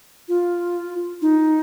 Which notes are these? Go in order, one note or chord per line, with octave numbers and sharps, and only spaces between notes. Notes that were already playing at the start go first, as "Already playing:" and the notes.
F4
D#4